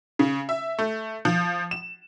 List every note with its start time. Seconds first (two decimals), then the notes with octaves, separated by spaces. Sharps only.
0.19 C#3
0.49 E5
0.79 A3
1.25 F3
1.71 E7